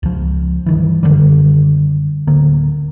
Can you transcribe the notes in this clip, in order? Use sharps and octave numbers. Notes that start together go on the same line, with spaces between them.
C#2 F3
G2 D#3 E3
F#2 D3 D#3 G3
D1 D3 A#3